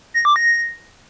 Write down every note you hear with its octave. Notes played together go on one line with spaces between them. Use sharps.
A#6
D6
A#6